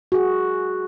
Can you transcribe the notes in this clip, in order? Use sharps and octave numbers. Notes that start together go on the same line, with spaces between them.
F#4 G#4